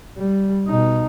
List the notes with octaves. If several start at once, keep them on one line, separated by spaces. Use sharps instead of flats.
G3
B2 D#4